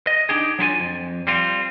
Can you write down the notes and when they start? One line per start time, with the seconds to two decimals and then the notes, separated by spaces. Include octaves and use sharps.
0.07 D#5
0.29 D4 D#4 G4 G#4
0.59 F#3 D4 E4 F4 A4 G#5
0.80 F2
1.27 G3 C4 F4